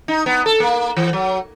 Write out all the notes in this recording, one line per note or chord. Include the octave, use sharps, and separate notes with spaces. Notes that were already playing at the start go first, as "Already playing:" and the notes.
D#4
B3
A4
A#3
E3
F#3